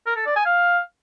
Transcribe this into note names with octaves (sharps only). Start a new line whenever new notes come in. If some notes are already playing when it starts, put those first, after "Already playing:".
A#4
A4
D5
G#5
F5